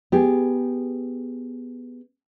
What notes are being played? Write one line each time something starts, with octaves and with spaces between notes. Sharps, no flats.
B3 G4 G#4